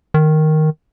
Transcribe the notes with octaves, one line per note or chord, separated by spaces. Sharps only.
D#3